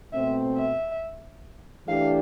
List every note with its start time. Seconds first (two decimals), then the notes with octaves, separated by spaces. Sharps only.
0.13 B2 A3 C4 E5
0.57 E5
1.87 E3 A3 D4 G4 F5